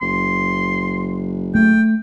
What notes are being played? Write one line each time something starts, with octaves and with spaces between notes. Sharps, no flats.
F#1 C6
A3 G5